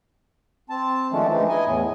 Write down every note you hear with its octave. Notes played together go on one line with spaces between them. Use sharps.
C4 A5
D#3 F3 G#3 A3 C#4 D4
D#3 E3 G#3 A3 D4 D#4
E4 D#5 G#5
E2 A2